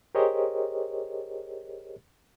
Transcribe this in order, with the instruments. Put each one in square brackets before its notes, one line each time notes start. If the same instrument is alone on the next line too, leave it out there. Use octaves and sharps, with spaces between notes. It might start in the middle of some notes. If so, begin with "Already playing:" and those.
[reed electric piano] G4 G#4 A#4 C5 C#5 D#5